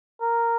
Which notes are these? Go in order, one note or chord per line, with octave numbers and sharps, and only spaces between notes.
A#4